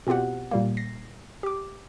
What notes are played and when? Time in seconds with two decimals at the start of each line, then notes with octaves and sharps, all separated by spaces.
0.07 B2 C4 F4 G4 F#5
0.51 A#2 G3 A#3
0.77 A#6 C7
1.43 G4 D6